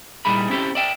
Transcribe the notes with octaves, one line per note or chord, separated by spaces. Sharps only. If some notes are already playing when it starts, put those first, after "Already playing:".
A#2 G3 D#4 E4 G#4 B5
C4 C#4 E4 F4 G4 A4
D5 E5 G5